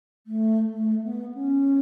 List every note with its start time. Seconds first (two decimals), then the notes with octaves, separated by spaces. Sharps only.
0.27 A3
0.73 A3
1.04 B3
1.35 C#4